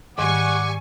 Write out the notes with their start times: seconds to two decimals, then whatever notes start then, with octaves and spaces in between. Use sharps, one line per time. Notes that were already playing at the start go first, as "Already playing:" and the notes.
0.18 G#2 D#3 G3 F#5 G#5 C#6 D6